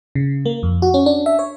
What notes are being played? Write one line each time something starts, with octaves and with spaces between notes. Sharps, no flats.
C#3
A#3
F2
F#4
C#4
D4
E5
C#5